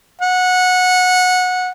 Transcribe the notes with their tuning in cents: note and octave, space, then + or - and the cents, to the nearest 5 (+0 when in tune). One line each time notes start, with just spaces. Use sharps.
F#5 -20